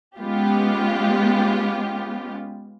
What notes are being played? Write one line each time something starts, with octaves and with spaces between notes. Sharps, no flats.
G#3 B3 C#4 F4 G4